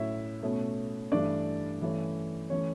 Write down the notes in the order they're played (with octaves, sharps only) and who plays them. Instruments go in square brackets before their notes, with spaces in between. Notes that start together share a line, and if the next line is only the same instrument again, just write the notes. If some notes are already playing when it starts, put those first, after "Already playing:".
Already playing: [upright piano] A2 F#3 C#4 E4 E5
B2 A3 C#4
G2 E3 A3 D4 D5
G2 E3 A3 C#4
E3 A3 C#4 C#5